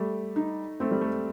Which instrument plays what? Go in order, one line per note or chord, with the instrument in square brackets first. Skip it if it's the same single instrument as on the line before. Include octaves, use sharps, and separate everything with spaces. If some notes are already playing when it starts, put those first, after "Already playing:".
Already playing: [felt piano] G3 [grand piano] A3
[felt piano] D#4
[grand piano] A3 [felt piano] C4
[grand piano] G3
A3